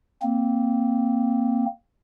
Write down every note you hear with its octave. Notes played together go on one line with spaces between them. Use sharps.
A#3 C4